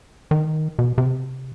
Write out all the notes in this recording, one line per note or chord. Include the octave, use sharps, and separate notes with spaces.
D#3
B2
C3